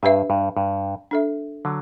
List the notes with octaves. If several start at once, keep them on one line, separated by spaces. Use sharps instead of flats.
G2 D4 G4 B4 E5
G2
G2
D4 A4 E5
D3 F#3